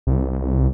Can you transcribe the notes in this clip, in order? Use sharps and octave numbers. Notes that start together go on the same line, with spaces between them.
C2